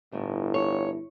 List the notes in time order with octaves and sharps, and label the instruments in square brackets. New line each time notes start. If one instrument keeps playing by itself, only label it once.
[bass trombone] G1 [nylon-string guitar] A2 A3
[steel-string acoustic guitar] C#5